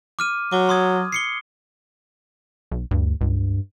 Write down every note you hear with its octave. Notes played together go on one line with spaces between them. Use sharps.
D6 F6 D#7
F#3 D6
C6 D#6 G#6
C7 C#7 G7
B1
D2 G2
C#2 G2